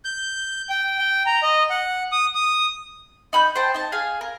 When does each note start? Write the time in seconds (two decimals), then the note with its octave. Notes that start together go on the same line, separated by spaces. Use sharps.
0.05 G6
0.69 G5
0.99 G5
1.26 A#5
1.43 D#5
1.70 F#5
2.12 D#6
2.35 D#6
3.33 D#4 B5 E6 G6
3.56 C5 G5 A5
3.74 D#4 A5
3.92 G#4 F5 G#5
4.21 A#4